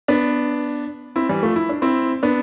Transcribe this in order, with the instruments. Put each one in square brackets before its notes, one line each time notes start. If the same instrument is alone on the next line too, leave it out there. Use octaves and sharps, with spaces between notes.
[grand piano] B3 D4
C4 E4
E3 G3
F3 A3
E4
D4
C4 E4
B3 D4